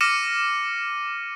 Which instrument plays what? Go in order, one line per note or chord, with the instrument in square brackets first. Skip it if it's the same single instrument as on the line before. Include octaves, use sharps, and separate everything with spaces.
[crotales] D6 F6 A#6 C#7 D#7 E7